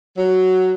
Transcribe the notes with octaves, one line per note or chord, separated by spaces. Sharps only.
F#3